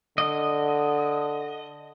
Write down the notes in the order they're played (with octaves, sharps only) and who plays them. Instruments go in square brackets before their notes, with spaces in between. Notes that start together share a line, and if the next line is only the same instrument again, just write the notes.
[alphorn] D3 [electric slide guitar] D#5